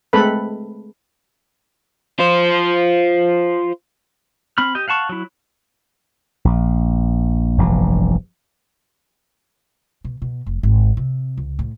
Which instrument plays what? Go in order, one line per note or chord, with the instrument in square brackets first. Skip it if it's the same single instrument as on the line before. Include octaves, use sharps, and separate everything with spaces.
[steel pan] G#3 A3 C4 A4 B4 B5
[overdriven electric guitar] F4 C5
[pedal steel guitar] C4 B5 F6
G4 D#5 G5
F5 F#5 A5 C#6
F#3 E4
[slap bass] A#1
F1 A#1 G2 E3
[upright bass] B2
B2
F1
G#1
C3
C#2
A2